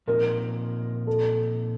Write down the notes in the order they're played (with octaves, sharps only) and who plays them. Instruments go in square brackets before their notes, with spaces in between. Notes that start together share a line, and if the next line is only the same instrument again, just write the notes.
[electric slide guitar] A#2 F3 C4 D#4 [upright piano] A#4
[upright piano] A4